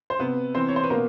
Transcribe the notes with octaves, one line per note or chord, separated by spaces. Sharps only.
C5
C3 B3 B4
E3 C4 C5
C#5
C5
B4
B2 A#3 A#4